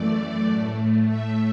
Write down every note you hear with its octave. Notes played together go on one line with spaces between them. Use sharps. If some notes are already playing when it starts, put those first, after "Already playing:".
Already playing: F#2 E3 A3 D5
A2
A3
E5